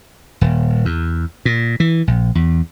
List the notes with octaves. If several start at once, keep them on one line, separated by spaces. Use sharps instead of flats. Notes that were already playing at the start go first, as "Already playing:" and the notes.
D#1
E2
A#2
E3
A#1
E2